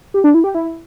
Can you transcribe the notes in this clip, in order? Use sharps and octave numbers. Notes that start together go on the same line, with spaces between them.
G4
D4
E4
G4
E4